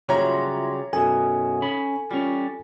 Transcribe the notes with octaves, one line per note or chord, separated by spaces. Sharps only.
C#3 F#3 G3 F4 C#5 E5 A#5 C6
F#2 B2 D#4 A4 G#5
C#4 B5
G3 C#4 F4